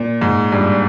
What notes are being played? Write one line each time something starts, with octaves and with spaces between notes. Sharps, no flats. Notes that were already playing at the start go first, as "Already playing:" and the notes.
Already playing: A#2
G#2
G2